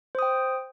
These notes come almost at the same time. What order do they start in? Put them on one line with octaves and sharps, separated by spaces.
C5 D#6 G5